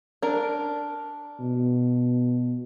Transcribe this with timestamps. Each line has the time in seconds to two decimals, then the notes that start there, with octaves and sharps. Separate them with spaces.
0.22 D4 A#4
1.40 B2